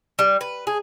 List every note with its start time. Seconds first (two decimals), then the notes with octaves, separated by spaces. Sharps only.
0.19 G3
0.41 B4
0.67 G#4